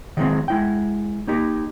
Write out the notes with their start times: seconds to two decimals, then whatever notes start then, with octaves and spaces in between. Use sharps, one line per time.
0.17 D#3 E3 F#3 G#3 A#3 C4
0.48 G#3 E4 G5
1.27 A#3 D#4 G4